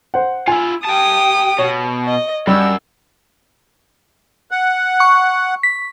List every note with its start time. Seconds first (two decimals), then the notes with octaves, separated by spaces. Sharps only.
0.14 C5 F#5
0.48 E4 F4 G#5
0.85 G4 G5 A5 D#6
1.58 B2 C#5
2.07 D#5
2.47 F#2 G3 E6
4.51 F#5
5.00 C#6
5.63 B6